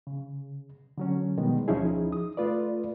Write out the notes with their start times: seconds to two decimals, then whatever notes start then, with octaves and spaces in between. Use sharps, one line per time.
0.07 C#3
0.98 D3 F#3 C#4
1.37 B2 D#3 G3 G#3 B3
1.68 D2 F3 C#4 D#4 E4 G#4
2.12 D#6
2.37 A3 F4 B4 D5